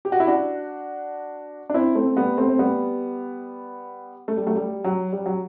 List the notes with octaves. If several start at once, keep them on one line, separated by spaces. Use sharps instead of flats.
G4
F#4
E4
D4 F#4
D4
C4 E4
A3 C4
G3 B3
A3 C4
C4
G3 B3
A3
G3
F#3 A3
G3
F#3
G3
F#3